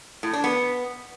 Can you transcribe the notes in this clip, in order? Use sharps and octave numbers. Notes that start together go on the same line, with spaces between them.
A2
D4
B3